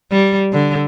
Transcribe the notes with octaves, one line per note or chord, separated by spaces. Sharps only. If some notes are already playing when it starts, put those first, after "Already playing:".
G3
D3